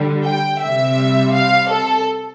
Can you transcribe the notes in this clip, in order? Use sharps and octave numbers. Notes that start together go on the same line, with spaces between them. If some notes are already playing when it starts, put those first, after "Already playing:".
Already playing: D3 G3
G5
C3 G3 E5
F5
A4